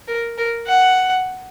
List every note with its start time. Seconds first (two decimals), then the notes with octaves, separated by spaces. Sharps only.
0.08 A#4
0.38 A#4
0.67 F#5